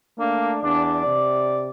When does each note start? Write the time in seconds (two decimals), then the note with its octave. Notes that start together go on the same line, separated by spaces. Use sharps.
0.19 A3 A#3 D4
0.63 E2 D4 D5
1.06 C3